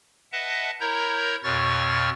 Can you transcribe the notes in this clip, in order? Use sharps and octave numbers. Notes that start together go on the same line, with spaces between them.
B4 D#5 E5 F#5 A5
E4 A#4 C#5 A#5 G6
F2 B2 C#5 C#6 F6 A6